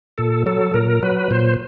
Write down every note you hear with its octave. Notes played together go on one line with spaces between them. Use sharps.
A#2 A4
F#3 A4
A#2 A#4
F#3 B4
A#2 C5